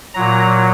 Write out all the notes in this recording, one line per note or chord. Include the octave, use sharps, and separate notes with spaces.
A#2 F#3 A#5